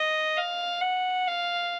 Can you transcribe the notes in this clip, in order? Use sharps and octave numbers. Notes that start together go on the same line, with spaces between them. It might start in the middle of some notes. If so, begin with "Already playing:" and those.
Already playing: D#5
F5
F#5
F5